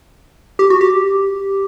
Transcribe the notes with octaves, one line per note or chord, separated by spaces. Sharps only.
G4
F#4
G4